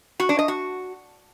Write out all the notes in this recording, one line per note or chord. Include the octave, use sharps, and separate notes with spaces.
F#4
D4
D#5
F#4